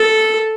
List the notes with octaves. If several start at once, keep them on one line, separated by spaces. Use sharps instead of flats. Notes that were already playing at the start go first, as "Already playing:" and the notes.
Already playing: A4